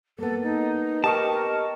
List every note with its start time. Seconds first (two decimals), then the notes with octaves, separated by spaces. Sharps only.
0.19 A#3 B3 A4
0.42 D#4
1.04 G4 A#4 D#5 A5 C#6